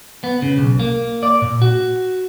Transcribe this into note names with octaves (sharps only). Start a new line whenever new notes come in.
B3
C#3
B1
A#3
D5
A#2
F#4